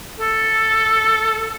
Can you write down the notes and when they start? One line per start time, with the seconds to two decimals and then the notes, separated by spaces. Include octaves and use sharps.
0.20 A4